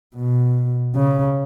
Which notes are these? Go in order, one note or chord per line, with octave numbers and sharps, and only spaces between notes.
B2
C#3